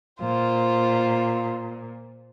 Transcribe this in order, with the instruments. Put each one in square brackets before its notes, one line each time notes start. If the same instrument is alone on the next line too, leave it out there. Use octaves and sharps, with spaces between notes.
[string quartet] A#2 [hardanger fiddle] F4 C5